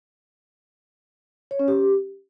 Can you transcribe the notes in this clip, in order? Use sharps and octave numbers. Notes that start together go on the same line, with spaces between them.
C#5
C#4
G4